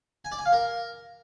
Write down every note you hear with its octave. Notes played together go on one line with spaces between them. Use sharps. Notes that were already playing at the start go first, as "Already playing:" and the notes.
G#5
D5
G#5
F5
A#4